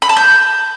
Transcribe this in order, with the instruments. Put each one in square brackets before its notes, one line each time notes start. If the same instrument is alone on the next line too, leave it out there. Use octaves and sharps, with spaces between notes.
[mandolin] B5
A5
G6